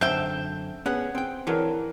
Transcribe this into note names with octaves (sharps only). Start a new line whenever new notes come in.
F#2 D3 C4 E5 G5 G6
B3 C#4 G#4 F#5
C4 G5
D3 E3 F#3 A#4